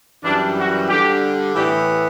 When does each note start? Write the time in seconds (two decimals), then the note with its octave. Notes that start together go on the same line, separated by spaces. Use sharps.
0.24 F#2 E3 G3 D4
0.56 F#4
0.89 D3 G3 D4 G4
1.54 A2 E3 B3 G4